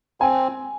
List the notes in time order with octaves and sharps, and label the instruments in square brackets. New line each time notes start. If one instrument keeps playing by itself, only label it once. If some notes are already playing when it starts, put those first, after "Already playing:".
[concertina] C4 [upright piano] G#5